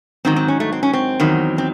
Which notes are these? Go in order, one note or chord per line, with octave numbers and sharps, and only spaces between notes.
G#2 D#3 F#3 C4
C4
C#4
A3
C4
C#4
C4
E2 D#3 F#3
C4